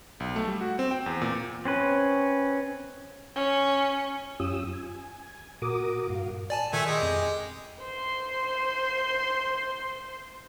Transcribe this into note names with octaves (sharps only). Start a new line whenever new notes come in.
B1
A3
G3
F#4
C4
G5
E2
A#2
C4 C#4 B4
C#4
F#2 C#4 F4 G4 D#6 E6
G#5
A#2 F#4 A#4 D6 D#6
G2 F#4 F5
D5 G#5 A5
A#2 D#3 A3 G#5
G#3 G4
F2
C5 C6